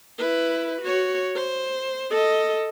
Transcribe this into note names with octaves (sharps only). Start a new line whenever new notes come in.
E4 B4
F#4 C#5
C5
A4 D#5